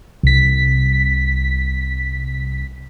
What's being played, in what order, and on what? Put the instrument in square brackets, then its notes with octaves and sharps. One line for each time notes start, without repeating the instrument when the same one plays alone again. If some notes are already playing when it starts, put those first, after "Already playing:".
[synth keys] C2 B6